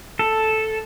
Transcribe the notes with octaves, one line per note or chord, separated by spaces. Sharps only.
A4